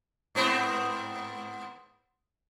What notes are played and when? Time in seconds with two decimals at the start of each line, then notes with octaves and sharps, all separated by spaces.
0.35 G#2 B3 C4